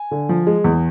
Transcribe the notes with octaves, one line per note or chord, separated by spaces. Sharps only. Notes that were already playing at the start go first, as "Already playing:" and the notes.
Already playing: G#5
D3
F3
G#3
E2